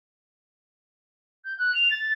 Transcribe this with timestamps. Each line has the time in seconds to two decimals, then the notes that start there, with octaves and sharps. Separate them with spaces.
1.45 G6
1.58 F#6
1.74 F7
1.91 A6